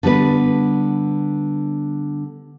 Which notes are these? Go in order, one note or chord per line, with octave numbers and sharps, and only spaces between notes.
D3 G3 B3 B4